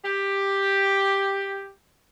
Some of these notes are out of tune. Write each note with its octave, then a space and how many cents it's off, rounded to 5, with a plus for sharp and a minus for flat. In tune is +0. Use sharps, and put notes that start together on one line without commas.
G4 +5